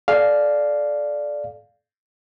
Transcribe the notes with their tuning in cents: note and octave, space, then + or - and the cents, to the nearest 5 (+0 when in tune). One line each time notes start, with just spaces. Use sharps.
A4 -35 D5 +0 F5 +0